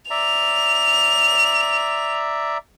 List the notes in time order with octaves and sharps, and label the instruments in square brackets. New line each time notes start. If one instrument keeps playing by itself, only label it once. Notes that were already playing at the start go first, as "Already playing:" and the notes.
[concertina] D5 E5 A#5 [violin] F7